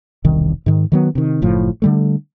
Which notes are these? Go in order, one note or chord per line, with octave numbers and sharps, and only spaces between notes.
E1 C2 D#3
G#2 D#3
D#3 F#3 B3
C3 D#3
F#1 A2 F3
D3 G3 A3